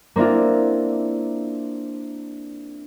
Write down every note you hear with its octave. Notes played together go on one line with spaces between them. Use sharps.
A#3 C4 D4 E4 F4